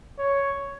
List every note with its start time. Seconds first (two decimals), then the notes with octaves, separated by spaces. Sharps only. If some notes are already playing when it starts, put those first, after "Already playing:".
0.18 C#5